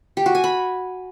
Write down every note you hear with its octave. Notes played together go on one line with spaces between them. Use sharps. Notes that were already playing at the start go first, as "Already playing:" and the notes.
G4
F#4
G#5
B5